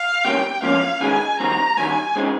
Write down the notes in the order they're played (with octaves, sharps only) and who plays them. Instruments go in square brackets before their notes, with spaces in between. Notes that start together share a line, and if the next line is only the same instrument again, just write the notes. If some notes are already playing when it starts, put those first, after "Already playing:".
Already playing: [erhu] F5
[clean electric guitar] C3 G3 A#3 C#4 [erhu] G5
[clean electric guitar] G#2 F3 A#3 C#4 [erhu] F5
[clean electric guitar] D#2 C#3 G#3 D#4 G#4 [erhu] G#5
[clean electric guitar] D#3 G3 C4 [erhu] A#5
[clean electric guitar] G2 D#3 G3 [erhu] G#5
[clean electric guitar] C#3 G#3 C4 D#4